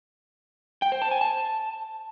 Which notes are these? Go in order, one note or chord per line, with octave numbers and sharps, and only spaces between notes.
G5
C5
A5
G#5
A5